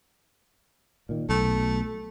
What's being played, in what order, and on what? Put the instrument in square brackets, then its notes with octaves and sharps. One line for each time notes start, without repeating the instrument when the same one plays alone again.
[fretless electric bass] A#2 D#3
[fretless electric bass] B1 [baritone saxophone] A3